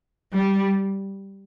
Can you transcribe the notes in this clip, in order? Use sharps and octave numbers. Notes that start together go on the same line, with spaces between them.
G3